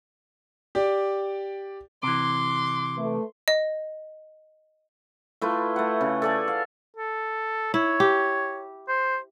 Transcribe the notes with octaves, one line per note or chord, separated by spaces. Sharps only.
G4 D5
C3 E3 C6 D6
A3 B4
D#5
A3 E4 F4 B4
A3 F#5
C#3
A4 D5 G#5
F5
A4
E4 C#5
G4
C5